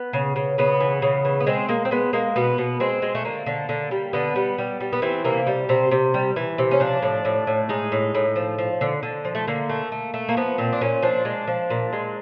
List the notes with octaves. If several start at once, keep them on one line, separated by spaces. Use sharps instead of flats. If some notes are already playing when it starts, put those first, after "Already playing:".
Already playing: B3
C#3
C#3
C#3 B3
E3
C#3
E3
B3
G#3 C4
G#3 A#3
C4
G#3 B3
G#3 A#3
B2 B3
B2
G#3 C4
G#3
A3
D3 A#3
D3
D3
G3
D3 B3
G3
G3
G3
B3
E3 C4
C3 A#3
G3
C3 C4
C3
G3
E3
C3
C#4
F3 D4
A2
A2
A2
G#3 D#4
A2
A2
F3
F3
D3
D3
F3
A3
D3 A#3
A3
A3
A3
A#3
F3 B3
A#2 C4
D4
A#2 C#4
F3 D4
G#3
F3
A#2
G#3